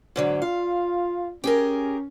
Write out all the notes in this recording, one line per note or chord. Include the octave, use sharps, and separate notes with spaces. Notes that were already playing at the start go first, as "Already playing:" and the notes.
G#2 D3 F#3
F4 F5
C#4 G4 G#4 A#4